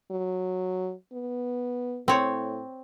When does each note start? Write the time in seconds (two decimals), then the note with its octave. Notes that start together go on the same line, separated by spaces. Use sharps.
0.11 F#3
1.13 B3
2.08 A2 C4 C#5